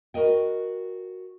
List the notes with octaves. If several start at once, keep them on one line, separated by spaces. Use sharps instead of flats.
F#4 A#4 B4 D#5 G5